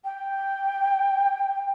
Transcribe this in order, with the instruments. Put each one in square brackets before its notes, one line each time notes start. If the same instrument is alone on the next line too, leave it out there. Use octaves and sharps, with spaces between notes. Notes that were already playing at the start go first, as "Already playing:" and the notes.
[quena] G5